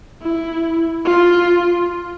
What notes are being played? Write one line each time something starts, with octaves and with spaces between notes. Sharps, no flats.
E4
F4